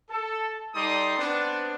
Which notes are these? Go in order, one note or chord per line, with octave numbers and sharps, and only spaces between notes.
A4
G3 D#4 A4 D5 C6 D#6
B3 C4 D4